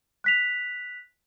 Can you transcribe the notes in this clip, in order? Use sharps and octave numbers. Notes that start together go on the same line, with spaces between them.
F#6 B6 F7